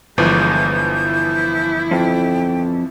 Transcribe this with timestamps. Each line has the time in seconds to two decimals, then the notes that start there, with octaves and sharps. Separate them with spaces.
0.18 G1 E3 F3 G#3 G6
0.94 E4
1.91 F2 G5